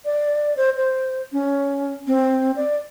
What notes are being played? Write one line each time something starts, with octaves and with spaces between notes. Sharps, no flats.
D5
C5
C5
C#4
C4
D5